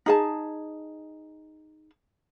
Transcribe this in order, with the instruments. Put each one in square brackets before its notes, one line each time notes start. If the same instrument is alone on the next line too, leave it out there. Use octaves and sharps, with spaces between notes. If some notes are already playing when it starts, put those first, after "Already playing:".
[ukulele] D#4 G#4 A5